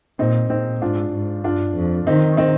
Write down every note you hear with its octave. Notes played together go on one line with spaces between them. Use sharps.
A#2 C4 D#4
A#2 C4 D#4
G#2 D4 F4
G#2
G2 D4 F4
F2
D#3 C4 D#4
C4 D#4